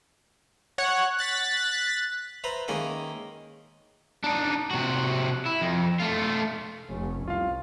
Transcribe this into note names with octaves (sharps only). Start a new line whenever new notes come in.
C#5 F#5 F#6
F#6 A6 B6
B4 C5 E5 A#5
D#3 G#3 A#3 C#4 D#5 E5
D4 D#4
C3 F#4
E4
F2
A3 F4
F1 C#4
C2 F4 F5